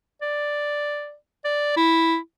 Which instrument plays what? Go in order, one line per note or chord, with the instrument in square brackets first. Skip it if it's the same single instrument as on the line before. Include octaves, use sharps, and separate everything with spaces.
[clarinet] D5
D5
E4